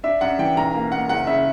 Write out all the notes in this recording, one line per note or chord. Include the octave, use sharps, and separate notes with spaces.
D4 E5
F#2 F#5
E3 G5
B1 A#5
A#3
A#3 F#5
F#1 F#5
C#3 E5